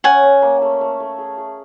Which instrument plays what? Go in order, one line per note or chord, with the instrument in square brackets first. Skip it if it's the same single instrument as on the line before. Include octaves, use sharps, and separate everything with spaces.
[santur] C#4 [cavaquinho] F#5 G#5
[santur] C#4
A#3
A3
A3
A3
G#4
G#4